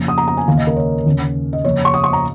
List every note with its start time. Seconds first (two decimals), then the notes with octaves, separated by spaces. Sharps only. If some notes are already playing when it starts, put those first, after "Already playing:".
Already playing: F2 C#3 A#3
0.08 D#6
0.18 A#5
0.28 A#5
0.37 G#5
0.48 D#2 C#3 A#3 F5
0.57 D#5
0.67 A#4
0.76 C#5
1.06 D#2 C#3 A#3
1.53 D#5
1.65 F2 C#3 A#3 C#5
1.85 C#6
1.94 D#6
2.04 C#6
2.13 A#5